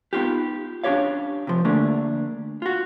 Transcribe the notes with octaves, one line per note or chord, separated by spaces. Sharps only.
B3 D#4 F4 G4
C#4 D4 F4 G4 C#5 F5
C3 F3
D3 A3 A#3 D4 G#4
F4 F#4